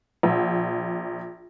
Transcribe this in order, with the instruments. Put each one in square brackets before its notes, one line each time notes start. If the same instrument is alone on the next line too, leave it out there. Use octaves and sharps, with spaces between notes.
[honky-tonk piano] A#1